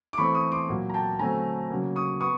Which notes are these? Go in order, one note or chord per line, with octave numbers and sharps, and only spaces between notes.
D6
E3 A3 C4 B5 C#6
C#6 D#6
C6 D6
A#2 F#3 A#3
A#5
G5 A5
D3 F#3 A3 C4 G#5 A#5
C#3 F#3 A#3
C#6 D#6
B3 C#6 D#6